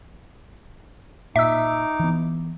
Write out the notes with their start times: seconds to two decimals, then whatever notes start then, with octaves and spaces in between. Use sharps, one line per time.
1.36 A#2 D#4 E5 D6 E6
2.00 E3 B3